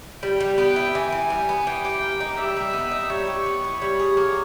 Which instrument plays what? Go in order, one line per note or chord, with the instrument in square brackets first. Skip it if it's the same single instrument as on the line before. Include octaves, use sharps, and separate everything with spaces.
[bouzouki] G3 [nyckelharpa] G5
[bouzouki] G3
[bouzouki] B3 [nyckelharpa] G5
[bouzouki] E4
[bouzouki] E3 [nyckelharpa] G#5
[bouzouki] E3
G3
B3
[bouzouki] E3 [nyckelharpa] G5
[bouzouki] G4
A#3
D#4
[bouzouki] G3 [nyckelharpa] E5
[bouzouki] G3
B3
D#4
[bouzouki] G3 [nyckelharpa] C#5
[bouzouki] G4
B3
E4
[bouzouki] G3 [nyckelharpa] C#5
[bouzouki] G#4
A#3